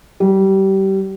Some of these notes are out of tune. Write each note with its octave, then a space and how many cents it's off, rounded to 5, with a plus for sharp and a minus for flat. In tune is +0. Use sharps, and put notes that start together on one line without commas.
G3 -25